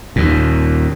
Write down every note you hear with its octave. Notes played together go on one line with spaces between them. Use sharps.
D#2 A#2